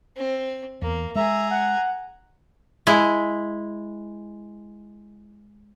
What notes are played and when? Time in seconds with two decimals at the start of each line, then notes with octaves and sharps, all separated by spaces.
0.16 C4
0.82 E2 A#3
1.15 G#3 G#4 E5 A#5
1.51 F#5
2.87 G#3 E4